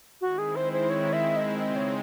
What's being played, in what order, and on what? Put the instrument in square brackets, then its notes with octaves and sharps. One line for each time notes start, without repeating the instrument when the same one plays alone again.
[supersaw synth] D#3 G#3 C4 E4 [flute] F#4
[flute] G#4
C5
C5
C#5
E5
D#5
[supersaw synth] C#3 G#3 C4 D#4 [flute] D#5
[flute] C#5